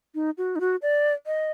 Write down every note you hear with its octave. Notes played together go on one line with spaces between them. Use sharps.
D#4
F#4
D#4
F#4
D5
D#5